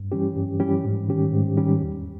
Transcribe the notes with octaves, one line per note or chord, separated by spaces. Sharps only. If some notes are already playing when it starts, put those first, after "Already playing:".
Already playing: G2
E3 G3 C#4 G4
G2
E3 G3 C#4 G4
G#2
D#3 G3 C#4 G4
G#2
D#3 G3 C#4 G4
E2